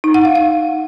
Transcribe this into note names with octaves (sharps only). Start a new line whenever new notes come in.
D#4
F#5
F5
F5